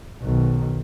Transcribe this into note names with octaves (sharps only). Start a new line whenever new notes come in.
B1 D#3